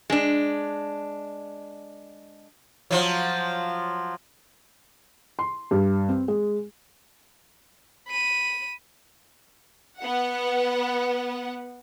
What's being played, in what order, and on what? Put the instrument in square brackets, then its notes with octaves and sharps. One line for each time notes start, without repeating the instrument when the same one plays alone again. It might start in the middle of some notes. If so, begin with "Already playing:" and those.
[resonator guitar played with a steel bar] G#3 D4
[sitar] F3 F#3
[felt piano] C6
G2
C4
G#3
[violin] B5 D#7
[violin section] B3 F#5